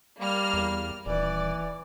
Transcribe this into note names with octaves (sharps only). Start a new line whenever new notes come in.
G3 A#3 F6
E2
D#1 E3 D5